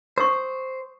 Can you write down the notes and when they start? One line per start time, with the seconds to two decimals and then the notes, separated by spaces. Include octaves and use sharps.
0.18 C5 C#6 D#6 E6